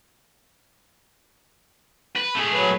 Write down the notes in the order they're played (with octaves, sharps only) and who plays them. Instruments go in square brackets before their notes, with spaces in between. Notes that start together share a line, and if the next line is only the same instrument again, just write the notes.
[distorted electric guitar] B4
A3 G#4
[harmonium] F#3 B4